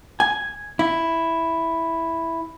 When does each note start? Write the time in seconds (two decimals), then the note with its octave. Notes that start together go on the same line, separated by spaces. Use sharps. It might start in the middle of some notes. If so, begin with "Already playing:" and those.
0.20 G#5
0.79 E4